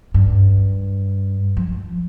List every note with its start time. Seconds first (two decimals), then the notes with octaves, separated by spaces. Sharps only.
0.14 G2
1.57 F3